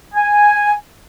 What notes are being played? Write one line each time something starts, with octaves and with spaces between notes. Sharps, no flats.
G#5